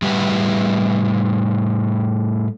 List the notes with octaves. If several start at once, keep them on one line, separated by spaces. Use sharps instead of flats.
A2 G3 E4 G4 B4 F#5